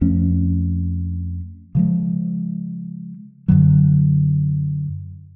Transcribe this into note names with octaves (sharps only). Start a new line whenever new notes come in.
F2 F3 A3 C#4
C#3 F3 G#3
F#2 D3 F#3